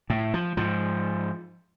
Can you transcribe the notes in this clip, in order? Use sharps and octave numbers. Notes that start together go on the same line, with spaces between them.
A2
F3
G#2 F3